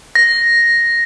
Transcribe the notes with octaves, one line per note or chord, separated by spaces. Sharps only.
A#6